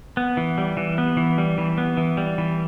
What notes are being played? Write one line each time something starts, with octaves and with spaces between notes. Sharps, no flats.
B3
E3
G3
E3
B3
E3
G3
E3
B3
E3
G3
E3